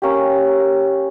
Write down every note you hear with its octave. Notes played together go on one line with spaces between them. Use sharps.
A#3 C#4 G4